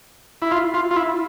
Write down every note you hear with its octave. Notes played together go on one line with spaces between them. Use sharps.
E4
F4
F4
F4
E4